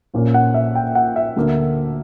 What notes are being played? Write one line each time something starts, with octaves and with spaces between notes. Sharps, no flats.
A#1 A#2 A#3 C#4
F#5
E5
G5
F#5
E5
D2 D3 A#3